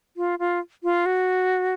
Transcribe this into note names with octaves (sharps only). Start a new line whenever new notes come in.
F4
F4
F4
F#4